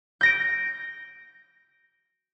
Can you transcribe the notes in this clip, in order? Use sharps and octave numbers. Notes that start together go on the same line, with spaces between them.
G6 A#6 D7